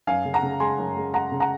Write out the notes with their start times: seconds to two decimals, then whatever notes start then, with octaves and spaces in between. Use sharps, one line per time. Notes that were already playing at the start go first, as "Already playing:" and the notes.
0.07 F#2 F5 G#5
0.25 C#3
0.33 F#5 A#5
0.43 C#3
0.60 G#3 G#5 C6
0.78 F#2
0.97 G#3
1.14 G#3 F#5 A#5
1.32 C#3
1.40 F#5 A#5